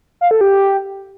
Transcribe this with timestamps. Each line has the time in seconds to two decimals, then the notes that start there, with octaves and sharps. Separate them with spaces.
0.21 F5
0.31 A4
0.41 G4